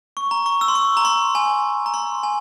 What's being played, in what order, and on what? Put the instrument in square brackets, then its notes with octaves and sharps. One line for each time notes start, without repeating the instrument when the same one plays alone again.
[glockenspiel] C#6
A#5
C#6
E6
C6
C#6
A#5
C6
G#5
A#5
C6
G#5